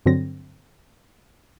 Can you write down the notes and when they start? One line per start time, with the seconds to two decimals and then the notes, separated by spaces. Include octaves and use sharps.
0.06 G2 D3 F#3 C4 A#6